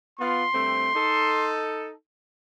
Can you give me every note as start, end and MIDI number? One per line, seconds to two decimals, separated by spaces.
0.19 0.43 59
0.19 0.43 65
0.19 1.51 84
0.53 0.89 43
0.53 0.89 57
0.53 0.89 60
0.94 1.91 63
0.94 1.91 69